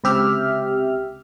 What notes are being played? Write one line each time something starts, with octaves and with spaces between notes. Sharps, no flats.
C#2 C3 G4 E5 F6